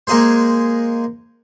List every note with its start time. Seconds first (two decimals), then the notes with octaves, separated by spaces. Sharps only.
0.07 G#3 A#3 D#4 G#4 C5